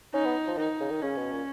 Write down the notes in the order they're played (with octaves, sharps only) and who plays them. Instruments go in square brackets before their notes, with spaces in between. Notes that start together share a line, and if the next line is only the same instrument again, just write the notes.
[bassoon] C#4 [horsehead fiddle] D#4
[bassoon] B3
F3
[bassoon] D#3 [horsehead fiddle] D#4
[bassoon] C#3
D#3
[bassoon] C#3 [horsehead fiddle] C#4
[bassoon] B2
A#2